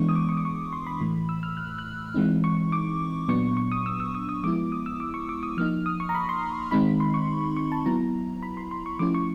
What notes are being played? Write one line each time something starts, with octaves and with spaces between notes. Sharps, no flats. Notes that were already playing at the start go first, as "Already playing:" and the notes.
Already playing: E3 G#3 B3 D4 C#6
D#6
D6
C#6
D6
C#6
C6
B5
A2 E3 A3
E6
F6
F#6
F#6
E3 G#3 C4 D#4
C#6
D6
A#2 F#3 B3 D4 C#6
C#6
D#6
E6
E6
D#6
D#6
F3 G#3 B3 E4 D6
D#6
E6
D6
C#6
D6
D#6
F3 A#3 D#4 F6
D#6
C#6
A#5
B5
C6
D#3 G#3 C4 D#4 B5
C6
C#6
C#6
A5
F#3 B3 E4 A#5
B5
C6
C6
C#6
F3 A3 C#4 E4 D6
C#6